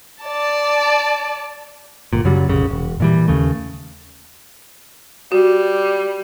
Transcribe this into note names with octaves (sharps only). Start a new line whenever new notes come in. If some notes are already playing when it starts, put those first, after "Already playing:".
D5 A5
G1 A#2
F#2 C#3 F#3 G3
F1 A#1 C#3
E1
A#2 E3 G3
D#2 C#3 A3
G3 F#4